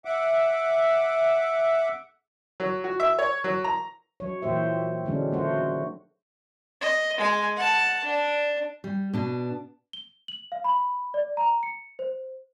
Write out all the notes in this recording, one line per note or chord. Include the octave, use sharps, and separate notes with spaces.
E5 F#5 D6
F#3
F#4
E5
C#5
F#3
A#5
F#3 C#5
A#2 E3 A#3 G4 C5 E5
D3 F#3 G#3 A3 C#4 D4
D#3 A3 A#3 F#4 C5
D#5
G#3 G#5
F#5 A5
D4
G3
B2 D4
G7
F#7
F5
B5
D5
A#5
C#7
C5